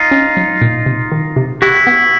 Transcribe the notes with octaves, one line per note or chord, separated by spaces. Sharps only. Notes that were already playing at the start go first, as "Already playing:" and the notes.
Already playing: D#4 F4
C#4
F#3
A#2
C3
D#3
C3
E4 F#4 G4
B3